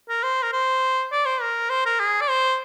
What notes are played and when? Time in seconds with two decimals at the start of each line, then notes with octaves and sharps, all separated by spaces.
0.09 A#4
0.23 C5
0.43 A#4
0.52 C5
1.12 D5
1.26 C5
1.41 A#4
1.70 C5
1.85 A#4
1.99 G#4
2.21 D5
2.29 C5